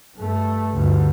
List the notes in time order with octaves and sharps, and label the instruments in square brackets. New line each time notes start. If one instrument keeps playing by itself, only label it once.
[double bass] G2 A3
D2 G2